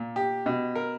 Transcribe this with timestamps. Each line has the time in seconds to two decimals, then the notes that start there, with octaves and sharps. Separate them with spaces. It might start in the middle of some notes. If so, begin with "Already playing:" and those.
Already playing: A#2
0.16 G4
0.46 B2
0.75 A#4